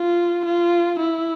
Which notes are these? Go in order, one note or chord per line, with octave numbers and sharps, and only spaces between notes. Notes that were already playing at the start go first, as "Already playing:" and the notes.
Already playing: F4
F4
E4